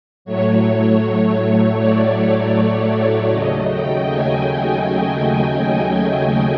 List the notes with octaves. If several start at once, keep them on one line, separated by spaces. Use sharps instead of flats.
A2 F#3 A3 C#5
D5
D#2 C#3 F#3 A3 D#5
G5
G#5